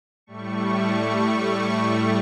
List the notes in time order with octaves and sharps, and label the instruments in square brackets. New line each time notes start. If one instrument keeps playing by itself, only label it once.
[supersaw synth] A2 G3 A3 C#6